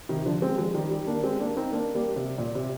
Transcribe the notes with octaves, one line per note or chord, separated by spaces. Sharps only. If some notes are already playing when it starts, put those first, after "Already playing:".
C3 D#3
D3 F3
G#3 C4
F3 G#3
D#3 G3
D#3 G3
A#3 D4
G#3 C4
A#3 D4
C4 D#4
A#3 D4
G3 A#3
C3
A#2
C3